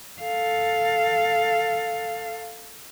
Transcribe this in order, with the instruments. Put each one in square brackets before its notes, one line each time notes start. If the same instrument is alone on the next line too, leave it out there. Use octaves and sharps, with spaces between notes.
[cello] A4 F5